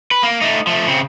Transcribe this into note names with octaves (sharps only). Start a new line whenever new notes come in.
B4
A#3
A3 D#4
F3 A3
C#3 C4